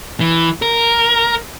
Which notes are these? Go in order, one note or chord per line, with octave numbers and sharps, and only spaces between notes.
E3
A#4